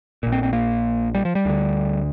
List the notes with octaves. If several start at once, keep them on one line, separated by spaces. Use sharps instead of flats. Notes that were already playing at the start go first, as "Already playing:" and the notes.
A#1 A#2
C4
C4
A#3
G3
F3
G3
D2 D3